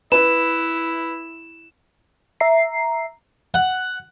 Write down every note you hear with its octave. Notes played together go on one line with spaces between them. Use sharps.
E4 B4 E7
E5 A#5 C7
F#5